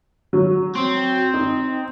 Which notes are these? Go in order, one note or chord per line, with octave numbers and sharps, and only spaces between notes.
F#3
C4
D#4